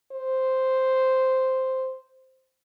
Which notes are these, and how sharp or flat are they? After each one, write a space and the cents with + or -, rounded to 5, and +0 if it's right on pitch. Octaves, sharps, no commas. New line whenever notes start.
C5 -5